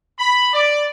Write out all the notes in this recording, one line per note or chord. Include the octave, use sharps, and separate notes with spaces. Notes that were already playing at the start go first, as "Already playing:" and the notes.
B5
D5